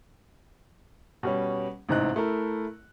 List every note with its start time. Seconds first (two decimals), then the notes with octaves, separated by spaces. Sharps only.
1.23 B2 G3 C#4
1.89 A1 G#2 C3 D#5 F#6
2.16 A3 E4 A#4